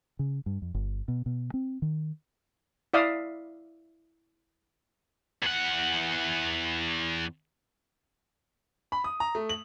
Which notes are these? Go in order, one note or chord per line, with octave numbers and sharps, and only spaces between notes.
C#3
G2
F2
G1
B2
B2
C4
D#3
E4 D5 E5 F5 D#6
E2 F#5
B5
D#6
A#5
A3
F#7